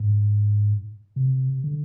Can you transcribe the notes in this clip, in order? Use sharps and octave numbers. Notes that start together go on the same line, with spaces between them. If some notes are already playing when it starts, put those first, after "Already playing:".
Already playing: G#2
C3
D3